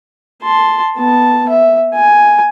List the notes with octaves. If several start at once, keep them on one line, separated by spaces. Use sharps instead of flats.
A5 C6
B3 A5
E5
G#5